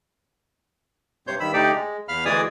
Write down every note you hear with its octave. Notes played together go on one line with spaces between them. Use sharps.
G2 C3 C5 C#5 G6
G2 D#3 B5 E6
D2 A3 D#4 G4 D5
G#3
E2 F5 B5 F6
D2 E3 G#3 D5 G#5 D#6